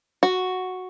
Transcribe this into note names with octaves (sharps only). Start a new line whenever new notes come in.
F#4